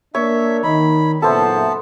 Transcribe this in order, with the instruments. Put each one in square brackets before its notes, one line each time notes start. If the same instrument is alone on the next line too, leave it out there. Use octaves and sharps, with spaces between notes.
[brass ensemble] A#3 D4 A#4 [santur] C#5 [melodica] E5
[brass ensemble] D#3 [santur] D#4 [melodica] B5
[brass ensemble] F#1 A#2 E5 [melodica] B3 A5 [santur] A4 C5